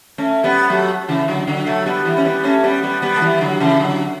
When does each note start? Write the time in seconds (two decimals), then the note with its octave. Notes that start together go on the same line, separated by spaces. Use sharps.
0.18 A3 C#4
0.44 G3 B3
0.70 F#3 A3
1.08 C#3 E3
1.28 D3 F#3
1.47 D3 F#3
1.66 F#3 A3
1.86 G3 B3
2.05 E3 G3
2.17 C#4
2.25 G3 B3
2.44 A3 C#4
2.64 G3 B3
2.83 G3 B3
3.02 G3 B3
3.16 A3
3.22 E3 G3
3.41 D3 F#3
3.60 C#3 E3
3.79 D3 F#3